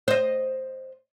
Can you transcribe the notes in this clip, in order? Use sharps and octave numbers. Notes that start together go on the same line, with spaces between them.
C5 D#5